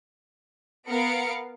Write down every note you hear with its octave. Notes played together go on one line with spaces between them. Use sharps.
B3 A#4 F5 C#7 D7